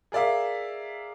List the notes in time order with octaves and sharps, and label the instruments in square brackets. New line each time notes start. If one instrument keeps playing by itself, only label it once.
[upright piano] G#4 A#4 D5 E5 F5